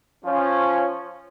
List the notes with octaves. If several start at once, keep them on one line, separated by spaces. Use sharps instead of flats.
F3 C#4